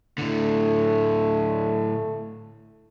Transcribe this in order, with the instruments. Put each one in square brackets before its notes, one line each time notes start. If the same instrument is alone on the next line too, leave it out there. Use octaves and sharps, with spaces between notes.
[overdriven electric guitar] A2 D3 [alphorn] A3